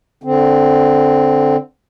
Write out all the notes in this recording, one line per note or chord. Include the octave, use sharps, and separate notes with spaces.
D3 C4